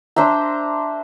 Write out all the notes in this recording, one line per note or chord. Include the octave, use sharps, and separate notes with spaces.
D4 C5 E5 A#5